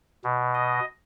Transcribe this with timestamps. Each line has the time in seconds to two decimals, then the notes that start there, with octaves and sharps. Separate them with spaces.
0.24 B2
0.54 D#5